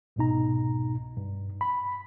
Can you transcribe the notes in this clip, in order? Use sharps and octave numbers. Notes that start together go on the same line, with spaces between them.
C2 G#2 B2 D#4 A#5
G2
B5